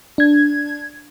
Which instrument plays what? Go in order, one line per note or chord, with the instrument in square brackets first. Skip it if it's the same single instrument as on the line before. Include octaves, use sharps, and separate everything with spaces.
[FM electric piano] D4 G#6